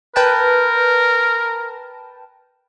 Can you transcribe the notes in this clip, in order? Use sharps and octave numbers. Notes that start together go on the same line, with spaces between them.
A#4 B4 G5 A5